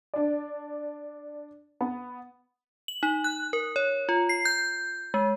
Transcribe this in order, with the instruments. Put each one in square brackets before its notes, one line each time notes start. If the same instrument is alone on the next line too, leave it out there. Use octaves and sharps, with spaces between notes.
[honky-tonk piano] D4 D5
B3
[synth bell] F#7
D#4
F#6
A#4
C#5
F4
C7
G6
G#3